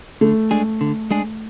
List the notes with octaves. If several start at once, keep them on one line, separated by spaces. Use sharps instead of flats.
D3 A3
G#3 D4 G#4
D3
G#3 D4 G#4